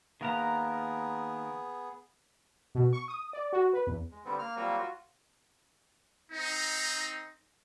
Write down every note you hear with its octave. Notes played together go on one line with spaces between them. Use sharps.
D#3 A#3 B3 G#4 A#4 F5 A#5 F#6
B2
C#6
D#6
D5
F#4
B4
E2
G#3
D3 G3 B3 C4
A#3 F6
F#3 G3 A#3 C4 F4 F#4
F4 F#4
C4 D#4